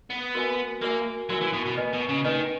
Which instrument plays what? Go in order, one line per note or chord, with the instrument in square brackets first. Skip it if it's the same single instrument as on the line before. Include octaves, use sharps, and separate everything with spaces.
[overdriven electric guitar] B3
[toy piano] F#4 A#4 E5 G#5
[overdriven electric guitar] A#3 [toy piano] F#4 A#4 E5 G#5
[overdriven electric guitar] F#3 [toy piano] F#4 A#4 E5 G#5
[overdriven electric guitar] E3
B2
B2
[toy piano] B4 D#5 G#5
[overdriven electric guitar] B2
C#3
[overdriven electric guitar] D#3 [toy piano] B4 D#5 G#5